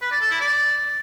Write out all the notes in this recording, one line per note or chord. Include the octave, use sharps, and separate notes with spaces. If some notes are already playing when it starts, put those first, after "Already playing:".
B4
D5
A4
E4
D5